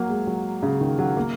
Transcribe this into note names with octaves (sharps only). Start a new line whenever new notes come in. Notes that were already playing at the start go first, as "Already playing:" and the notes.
Already playing: F#3 A#3
G#3
F#3
C#3
D#3
F#3
A#3